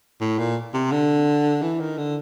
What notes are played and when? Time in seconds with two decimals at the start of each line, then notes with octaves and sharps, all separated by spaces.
0.21 A2
0.38 A#2
0.74 C3
0.92 D3
1.62 E3
1.80 D#3
1.98 D3